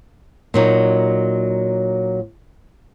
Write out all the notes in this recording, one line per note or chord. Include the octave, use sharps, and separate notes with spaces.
A#2 F#3 D#4